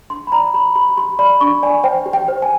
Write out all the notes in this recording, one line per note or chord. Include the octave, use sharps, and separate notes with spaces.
D4 C6
B5
D5 A#5
G4 B5
G4 B5
G4 C6
D5 B5
D4 C#6
D5 G#5
C5 G5
G4
G5
C5
G#5